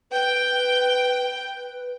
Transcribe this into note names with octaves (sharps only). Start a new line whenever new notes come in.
B4 G5